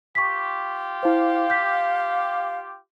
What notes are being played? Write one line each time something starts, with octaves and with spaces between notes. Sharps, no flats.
F4 G4 C#6 B6
E4 C5 F5
G6 B6